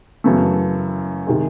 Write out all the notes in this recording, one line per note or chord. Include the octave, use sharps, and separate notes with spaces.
F#2 C#3 E3 A3
C3 D#3 G#3